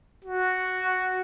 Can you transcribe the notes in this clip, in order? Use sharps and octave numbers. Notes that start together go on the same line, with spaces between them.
F#4